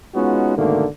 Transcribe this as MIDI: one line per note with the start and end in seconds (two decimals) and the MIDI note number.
0.15 0.55 56
0.15 0.55 59
0.15 0.55 61
0.15 0.55 63
0.15 0.55 65
0.15 0.55 66
0.57 0.86 44
0.57 0.86 47
0.57 0.86 50
0.57 0.86 51
0.57 0.86 57
0.57 0.86 58